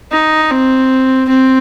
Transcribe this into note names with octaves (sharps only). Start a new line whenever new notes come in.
D#4
C4
C4